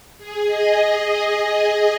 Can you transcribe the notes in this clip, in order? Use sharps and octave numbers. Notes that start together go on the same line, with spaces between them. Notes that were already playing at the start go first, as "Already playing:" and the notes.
G#4
D#5
D#5